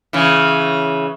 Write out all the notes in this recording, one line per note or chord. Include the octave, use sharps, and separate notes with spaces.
C#3 E3